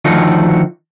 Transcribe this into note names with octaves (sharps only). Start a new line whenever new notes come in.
D3 D#3 F3 A3 D#4 F#4